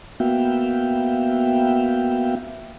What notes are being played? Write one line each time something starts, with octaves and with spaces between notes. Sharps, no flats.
A#3 B3 F#4 E5 F5 G5